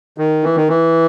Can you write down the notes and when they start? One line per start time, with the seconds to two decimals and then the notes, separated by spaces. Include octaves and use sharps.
0.18 D#3
0.44 E3
0.56 D#3
0.69 E3